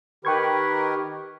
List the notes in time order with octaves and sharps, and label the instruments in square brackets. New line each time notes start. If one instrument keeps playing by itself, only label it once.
[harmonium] D#3 G4 A#4 [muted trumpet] B4 [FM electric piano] G5 C#6 G#6